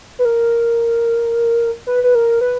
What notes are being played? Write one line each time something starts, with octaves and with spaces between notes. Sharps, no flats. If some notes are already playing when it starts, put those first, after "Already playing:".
B4
A#4
B4
B4
A#4
B4